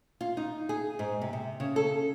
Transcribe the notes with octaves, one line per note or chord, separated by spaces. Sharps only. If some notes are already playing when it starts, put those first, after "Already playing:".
F4
D#4
G#4
G#2
C3
C3
C#3
A4